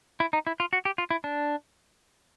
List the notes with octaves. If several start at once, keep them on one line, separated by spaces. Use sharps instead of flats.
E4
D#4
E4
F4
F#4
G4
F4
E4
D4